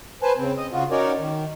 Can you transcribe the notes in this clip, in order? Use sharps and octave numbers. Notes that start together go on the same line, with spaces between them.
B4 C5 G#5 A5
C#3 C4
D#5
C#3 F4 F#4
C#4 D#4 F#4 A#4 C#5 D5
D#3